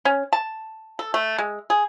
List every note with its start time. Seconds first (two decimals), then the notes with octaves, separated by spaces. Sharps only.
0.05 C#4
0.33 A5
0.99 A4
1.14 A3
1.38 G#3
1.70 G#4